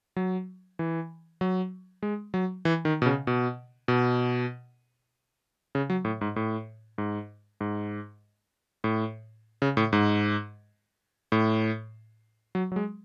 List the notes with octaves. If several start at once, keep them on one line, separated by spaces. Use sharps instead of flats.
F#3
E3
F#3
G#3
F#3
E3
D#3
B2
C#3
B2
B2
C#3
F#3
A2
G#2
A2
G#2
G#2
A2
C#3
A2
G#2
A2
F#3
F#3
G#3